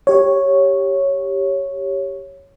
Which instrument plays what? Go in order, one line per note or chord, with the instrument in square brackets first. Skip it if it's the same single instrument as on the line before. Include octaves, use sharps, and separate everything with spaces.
[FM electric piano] G4 C#5